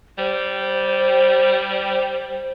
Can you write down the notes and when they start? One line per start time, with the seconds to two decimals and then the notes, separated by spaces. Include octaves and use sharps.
0.18 G3 C5